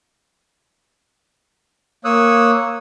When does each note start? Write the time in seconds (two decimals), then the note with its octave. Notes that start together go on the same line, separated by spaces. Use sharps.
2.05 A#3 C#5 D#6 E6 F#6